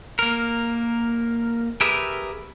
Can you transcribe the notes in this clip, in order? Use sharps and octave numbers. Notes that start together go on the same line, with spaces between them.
A#3 A#4
G4 G#4 A#4 B4 E5